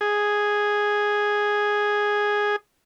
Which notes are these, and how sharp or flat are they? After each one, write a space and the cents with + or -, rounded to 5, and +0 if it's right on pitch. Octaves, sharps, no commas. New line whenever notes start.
G#4 +0